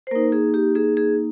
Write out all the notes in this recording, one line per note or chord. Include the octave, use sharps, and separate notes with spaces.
C5
A#3 D#4 A#4
G#4
G4
G#4
G#4